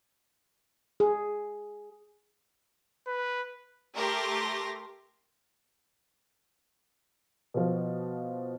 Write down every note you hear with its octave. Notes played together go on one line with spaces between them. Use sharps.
G#4
B4
A3 G4 A#4 C6 A#6
B2 F3